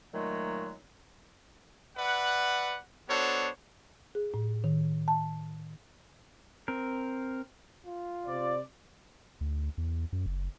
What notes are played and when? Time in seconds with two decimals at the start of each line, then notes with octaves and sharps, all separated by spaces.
0.14 A#2 D#3 F#3 G#3 A3
1.97 B4 D5 E5 F#5
3.09 B3 D4 F#4 A4 C5 C#5
4.15 G#4
4.34 A2
4.64 D#3
5.08 A5
6.68 C4 A#4
7.86 F4
8.26 C3 C5 D5
9.41 D2
9.78 E2
10.13 F#2
10.26 F#1